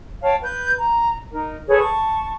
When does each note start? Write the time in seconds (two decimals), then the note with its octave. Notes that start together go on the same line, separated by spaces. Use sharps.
0.22 C#5 F5 G5 A5
0.41 B4 G6
0.77 A#5
1.32 D#4 A#4
1.68 G#4 A4 B4 C#5
1.80 A5 C#6